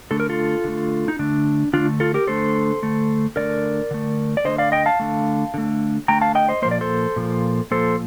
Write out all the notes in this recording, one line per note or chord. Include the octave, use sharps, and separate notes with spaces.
D3 A3 A4
A#4
F4 A4
D3 A3
D#4
D3 A3 D4
D3 A3 D4 F4
F4 A4
G4 A#4
D3 A3 A4 C5
D3 A3
D3 A3 A#4 D5
D3 A3
D5
D3 A3 C5 D#5
D5 F5
D#5 G5
F5 A5
D3 A3
D3 A3
D3 A3 G5 A#5
F5 A5
D#5 G5
C5 D#5
A#2 F3 A#3 C5
D5
A4 C5
A#2 F3 A#3
A#2 F3 A#3 A4 C5